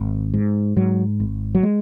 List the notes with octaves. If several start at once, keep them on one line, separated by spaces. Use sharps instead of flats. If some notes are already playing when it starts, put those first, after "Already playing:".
Already playing: G#1
G#2
G#2 F#3
G#1
F#3
G#3